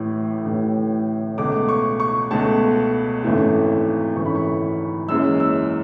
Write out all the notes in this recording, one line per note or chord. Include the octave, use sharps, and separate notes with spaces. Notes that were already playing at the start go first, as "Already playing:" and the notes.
Already playing: A1 A2 E3
A1 A2 E3
C#2 B2 A3 D6
C#6
C#6
C#2 B2 A3 A5
G#1 F#2 E3 A3
G#1 F#2 E3 A3 C#6
B5
C#6
F#1 F#2 E3 G#3 E6
E6